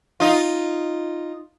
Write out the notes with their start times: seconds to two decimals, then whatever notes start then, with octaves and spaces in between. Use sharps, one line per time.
0.20 D#4 F4